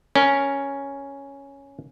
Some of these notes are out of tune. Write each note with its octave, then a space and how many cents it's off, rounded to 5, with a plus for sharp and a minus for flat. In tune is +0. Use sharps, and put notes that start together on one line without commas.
C#4 +0 A#4 +0